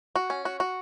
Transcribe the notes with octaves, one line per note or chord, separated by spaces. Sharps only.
F#4
C#4
F#4
F#4